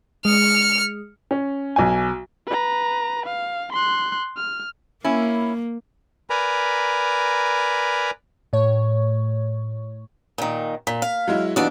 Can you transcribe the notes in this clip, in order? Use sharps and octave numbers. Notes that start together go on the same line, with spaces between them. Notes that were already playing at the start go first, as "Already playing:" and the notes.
G#3 F6 C#7
C#4
B1 G#5
B4 A#5
F5
C6 F#6
F6
A#3 C#4 E4
A#4 B4 D5 G#5 A#5 B5
A2 C#5
A#2 D#3
A#2 B6
F5
F#3 G#3 E4
D#2 E3 B3 D4 F#4 D5